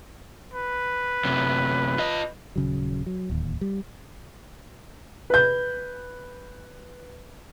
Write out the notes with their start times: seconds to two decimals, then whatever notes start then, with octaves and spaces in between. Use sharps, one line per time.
0.54 B4
1.25 F#2 C3
1.98 F4 D#5
2.56 D#1 C#3 F#3
3.06 F#3
3.30 D1 D#2
3.61 G3
5.30 B4 G6